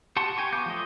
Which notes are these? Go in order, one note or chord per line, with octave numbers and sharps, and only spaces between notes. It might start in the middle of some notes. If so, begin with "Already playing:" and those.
G4 F#5 A5 C6 C#6
G4 G5 G#5 C#6
B3 F5 D6 G6
F3 A3 D#5